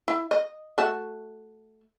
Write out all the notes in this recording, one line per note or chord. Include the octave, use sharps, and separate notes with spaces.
E4
D#5
A3 F#4 A5